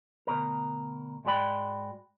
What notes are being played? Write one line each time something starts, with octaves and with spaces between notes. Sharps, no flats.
D2 B2 A#4
G#2 G#3 F#4 D5 G5 B5